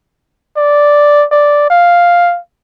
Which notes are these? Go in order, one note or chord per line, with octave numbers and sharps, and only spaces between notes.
D5
D5
F5